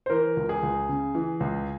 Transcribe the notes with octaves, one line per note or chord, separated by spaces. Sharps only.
C5
E3 A#4
C#2
G#4
C#2
C#3
E3
C#2